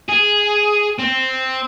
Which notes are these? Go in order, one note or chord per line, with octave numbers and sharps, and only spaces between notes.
G#4
C4